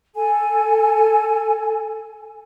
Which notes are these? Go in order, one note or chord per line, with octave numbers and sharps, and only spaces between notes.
A4 G#5